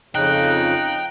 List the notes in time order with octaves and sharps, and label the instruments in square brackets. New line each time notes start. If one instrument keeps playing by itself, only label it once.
[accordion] F2 C#3 [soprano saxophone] D#4 [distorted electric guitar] G5 [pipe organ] F#6